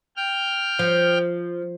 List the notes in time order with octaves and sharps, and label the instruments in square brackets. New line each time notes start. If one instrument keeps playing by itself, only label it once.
[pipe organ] G5 F6
[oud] F3